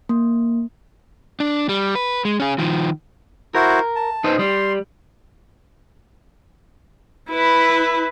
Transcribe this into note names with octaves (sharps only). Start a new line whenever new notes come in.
A#3
D4
G3
B4
G#3
C#4 G#4
D#3 F3
E4 F#4 A#4 C5
A5
D#4 B4 C5
G3 C6
E4 B4